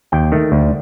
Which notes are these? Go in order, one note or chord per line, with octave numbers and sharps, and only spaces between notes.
D#2 G5
D#3 A3
D2